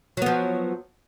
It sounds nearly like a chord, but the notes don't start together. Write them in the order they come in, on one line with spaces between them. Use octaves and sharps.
F#3 B3 F3